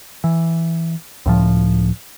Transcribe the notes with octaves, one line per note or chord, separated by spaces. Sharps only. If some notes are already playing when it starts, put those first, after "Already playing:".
E3
C#2 A2 F3